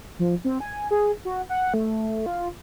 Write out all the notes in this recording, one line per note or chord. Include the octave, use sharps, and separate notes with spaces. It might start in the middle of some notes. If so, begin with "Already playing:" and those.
F3
C4
G#5
G#4
F#4
F#5
A3
F4